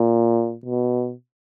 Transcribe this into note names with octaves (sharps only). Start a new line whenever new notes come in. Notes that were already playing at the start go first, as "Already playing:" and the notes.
Already playing: A#2
B2